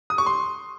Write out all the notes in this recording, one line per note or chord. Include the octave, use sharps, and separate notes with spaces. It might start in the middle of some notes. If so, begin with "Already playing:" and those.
D#6
C#6
C6